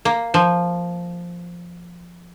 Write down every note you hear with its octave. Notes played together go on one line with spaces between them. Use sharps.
A#3
F3